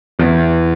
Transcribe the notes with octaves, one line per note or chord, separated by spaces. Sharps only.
E2